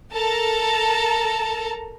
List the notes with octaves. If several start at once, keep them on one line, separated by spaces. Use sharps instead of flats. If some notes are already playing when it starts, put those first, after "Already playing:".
A4 A#4 A5 A#5